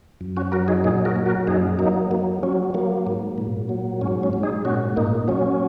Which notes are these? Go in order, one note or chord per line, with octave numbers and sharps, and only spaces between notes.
F#2
C#4 F#4
F#3 F#4 A#4
D#4 G#4
A#2 D#4 G#4
F#4 A#4
F#3
F#4 A#4
F#2 D#4 G#4
F#3 A#3 D#4
F#3 A#3
F#3 C#4
F#3 A#3
G#2
A#2
F#3
G#2 C#4
C#4
G#2
D#4 G#4
A#2 C#4 F#4
A#2 A#3 D#4
F#3 C#4